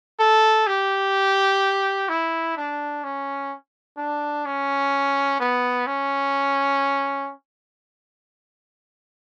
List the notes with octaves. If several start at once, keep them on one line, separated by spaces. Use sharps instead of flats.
A4
G4
E4
D4
C#4
D4
C#4
B3
C#4